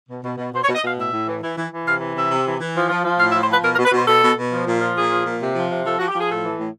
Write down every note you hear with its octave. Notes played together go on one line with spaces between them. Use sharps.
B2
B2
B2
B2 C5
C#5
B2
D#5
B2 F5
A2 E5
A2
E3
E3
E3
E3
C3 F5
E3
C3 E5
C3
E3
E3
F3
F3
F3
A2 F5
E5
F3
C5
F3 B4
B2 A#4
A#4
B2
B4
B2 C5
B2 A4
B2
B2
F3
A#2
F3
A#2 G#4
F3
A#2
C3
F3
C3
F3 A4
F3 F#4
G4
F3 G#4
A2 A4
E3
A2